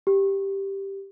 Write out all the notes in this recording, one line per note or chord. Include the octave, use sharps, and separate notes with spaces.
G4